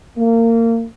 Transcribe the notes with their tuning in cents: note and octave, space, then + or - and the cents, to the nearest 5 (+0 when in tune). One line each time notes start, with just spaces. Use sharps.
A#3 -30